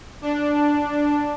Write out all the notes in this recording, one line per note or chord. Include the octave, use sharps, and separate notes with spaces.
D4